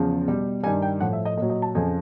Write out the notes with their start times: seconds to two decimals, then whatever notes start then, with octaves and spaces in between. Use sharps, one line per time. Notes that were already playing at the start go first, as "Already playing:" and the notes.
Already playing: E2 C#3 F3
0.27 B2 G3
0.63 G2 D#3 G3 G#5
0.82 G5
1.00 A2 F3 F#5
1.13 E5
1.25 D#5
1.37 A#2 D#5
1.42 F#3
1.49 D#5
1.62 A5
1.75 F2 C#3 F3 G#5